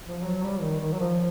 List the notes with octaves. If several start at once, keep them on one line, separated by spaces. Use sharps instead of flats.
F3
F#3
G3
D#3
D#3
F#3
F3